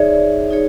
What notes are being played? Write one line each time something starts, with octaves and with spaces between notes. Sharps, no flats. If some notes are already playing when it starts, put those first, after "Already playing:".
Already playing: D#4 G#4 C#5 D5 E5
D#4 G#4 C#5